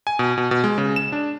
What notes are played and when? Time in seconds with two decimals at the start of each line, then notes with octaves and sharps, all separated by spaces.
0.07 G#5
0.19 B2
0.38 B2
0.51 B2
0.64 G#3
0.78 C#3
0.96 E7
1.12 D4